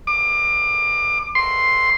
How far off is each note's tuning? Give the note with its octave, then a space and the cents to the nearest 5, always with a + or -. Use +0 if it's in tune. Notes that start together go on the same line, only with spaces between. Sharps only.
D6 +30
C6 +5